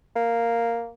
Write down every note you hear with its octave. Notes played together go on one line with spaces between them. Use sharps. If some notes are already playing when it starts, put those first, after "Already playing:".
A#3